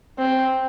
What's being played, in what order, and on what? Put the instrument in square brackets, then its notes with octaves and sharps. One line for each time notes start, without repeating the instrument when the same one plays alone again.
[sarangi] C4